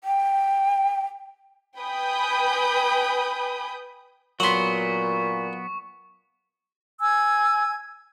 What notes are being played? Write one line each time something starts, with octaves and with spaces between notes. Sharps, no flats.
G5
B4 G5 G#5 B5 D#6 G6
A#2 F#3 B3 F#5 C6 C#6
G#5 E6 G#6